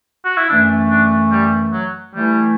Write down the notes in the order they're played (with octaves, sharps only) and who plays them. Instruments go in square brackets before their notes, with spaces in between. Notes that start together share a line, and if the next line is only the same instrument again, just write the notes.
[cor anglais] F#4
E4
[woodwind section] F#2 E3 A3 [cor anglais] D4
[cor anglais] D4
G3
F#3
[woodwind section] E3 A3 E4 [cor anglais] G3